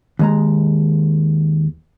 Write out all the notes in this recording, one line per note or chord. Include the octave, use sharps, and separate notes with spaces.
D#2 G#3 A#5